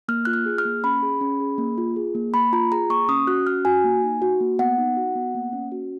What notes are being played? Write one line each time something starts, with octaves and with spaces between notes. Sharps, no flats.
A#3 F6
F4 F#6
F6
G#4
F6
A#3
C#4 B5
G#4
C#4
G#4
A#3
F4
G#4
A#3
A#3 B5
F4 A#5
G#4 A#5
A#3 C#6
C#4 D#6
F#4 F#6
C#4 F6
F#4 G#5
A#3
D#4
F#4
A#3
B3 F#5
D#4
F#4
B3
A#3
C#4
F#4